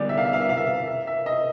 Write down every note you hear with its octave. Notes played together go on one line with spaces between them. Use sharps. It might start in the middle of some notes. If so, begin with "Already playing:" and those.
Already playing: D3 G3 B3 D#4 G#4 D5
E5
F5
E5
F5
E5
F5
E5
E5
E5
D#5